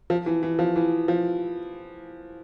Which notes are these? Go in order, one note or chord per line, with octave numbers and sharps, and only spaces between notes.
F3
E3
E3
F3
E3
F3